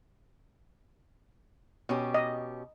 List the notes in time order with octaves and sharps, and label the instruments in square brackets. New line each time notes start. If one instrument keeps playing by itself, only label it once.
[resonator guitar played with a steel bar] B2 C#4 G4
[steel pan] D#5